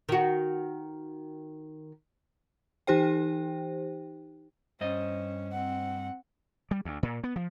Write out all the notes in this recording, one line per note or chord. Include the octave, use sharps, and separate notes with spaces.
D#3 F#4
E3 D#4 G4 C5 G5
G2 C#4 C5 D#5
C4 F#5
G3
D2
A#2
B3
F3